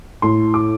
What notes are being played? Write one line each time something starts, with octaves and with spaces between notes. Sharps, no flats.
A2 C6
D6